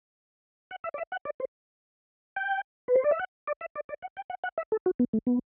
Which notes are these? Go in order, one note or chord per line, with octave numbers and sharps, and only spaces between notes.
F#5
E5
D5
E5
F#5
D5
C5
G5
B4
C5
D5
E5
F#5
D5
E5
D5
D5
F#5
G5
F#5
F#5
E5
A4
F#4
B3
A3
B3